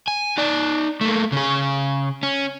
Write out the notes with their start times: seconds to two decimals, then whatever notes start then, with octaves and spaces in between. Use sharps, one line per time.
0.08 G#5
0.38 D#4 D5
1.01 A3 A#3
1.32 C#3 G#4
2.23 C#4